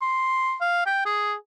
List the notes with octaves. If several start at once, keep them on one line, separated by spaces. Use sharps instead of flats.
C6
F5
G5
G#4